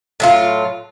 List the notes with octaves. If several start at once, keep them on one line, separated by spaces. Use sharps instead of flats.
A2 F#3 F4